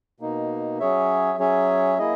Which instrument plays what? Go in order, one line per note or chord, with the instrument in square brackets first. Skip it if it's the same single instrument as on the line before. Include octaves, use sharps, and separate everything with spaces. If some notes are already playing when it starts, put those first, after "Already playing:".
[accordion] B2 A#3 D#4
F#3 C#4 G#4 C#5 E5
F#3 C#4 G#4 C#5 E5
A#3 E4 G#4 D#5